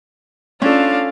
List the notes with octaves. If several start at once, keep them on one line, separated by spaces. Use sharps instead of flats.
C#4 D4 F4 A4 F5